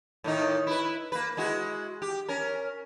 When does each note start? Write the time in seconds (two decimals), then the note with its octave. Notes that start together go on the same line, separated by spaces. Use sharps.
0.24 A2 D#3 D#4
0.67 E4 B4
1.12 A#3 B4
1.37 G#3 E4 F#4
2.02 G4
2.28 C#4 A#4